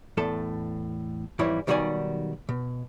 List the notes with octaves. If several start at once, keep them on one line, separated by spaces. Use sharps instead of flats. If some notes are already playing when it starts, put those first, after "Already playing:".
E2 A2 A4 A5
F2 G#2 E3 G3 E4 C#5
B1 D#3 G3 F#4 D5 G#5
B2